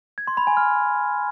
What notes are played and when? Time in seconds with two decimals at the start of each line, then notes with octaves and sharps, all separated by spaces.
0.18 G#6
0.27 C6
0.37 B5
0.47 G#5
0.57 F6